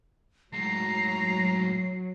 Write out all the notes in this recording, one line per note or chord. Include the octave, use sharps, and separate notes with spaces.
A2 F#3 G#3 A#5 C7